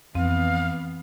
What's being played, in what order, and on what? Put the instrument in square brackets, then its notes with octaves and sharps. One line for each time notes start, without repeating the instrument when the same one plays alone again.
[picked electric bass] F2 [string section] E3 B3 [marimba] C4 [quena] F5